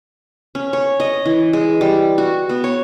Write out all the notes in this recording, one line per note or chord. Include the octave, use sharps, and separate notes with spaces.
C#4
C#5
D#5
E3
G#3
G3
F#4
B3
C#5